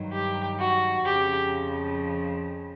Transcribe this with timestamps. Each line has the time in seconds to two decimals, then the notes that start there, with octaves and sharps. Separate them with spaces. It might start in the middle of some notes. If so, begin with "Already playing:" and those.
Already playing: G2 D#3 F#3
0.13 G4
0.59 F#4
1.05 F2 C#3 F3 G4